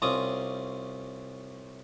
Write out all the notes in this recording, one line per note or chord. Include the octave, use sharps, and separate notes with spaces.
C2 C4 C#4 F4 D6 D#6